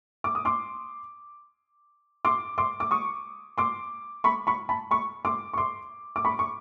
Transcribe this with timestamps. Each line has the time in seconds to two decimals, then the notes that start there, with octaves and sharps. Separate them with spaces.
0.24 D6
0.35 D#6
0.45 C6 D6
2.25 C6 D6
2.58 C6 D6
2.80 D6
2.91 C#6 D#6
3.58 C6 D6
4.24 B5 C#6
4.47 B5 C#6
4.69 A5 B5
4.91 B5 C#6
5.25 C6 D6
5.53 C#6
5.57 C6 D6
6.16 D6
6.25 B5 C#6
6.39 C#6